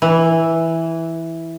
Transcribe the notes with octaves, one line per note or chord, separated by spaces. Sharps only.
E3